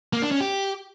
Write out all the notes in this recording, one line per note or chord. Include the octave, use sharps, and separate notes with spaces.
A#3
D4
C#4
G4